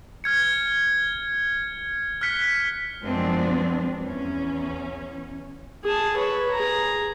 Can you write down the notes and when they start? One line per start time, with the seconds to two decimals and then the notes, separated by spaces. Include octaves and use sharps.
0.24 F6 G#6 C#7
2.21 F6 F#6 B6 C#7
3.04 F#2 F3 G#3 B3 C4 D4
4.05 E2 C#4
5.84 G#4 A5
6.16 B4 C#5
6.51 G#4 A#5